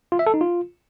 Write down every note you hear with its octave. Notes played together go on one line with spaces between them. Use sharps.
F4
E5
A4
D#4
F4